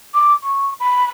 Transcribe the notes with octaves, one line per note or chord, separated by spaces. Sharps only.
D6
C#6
B5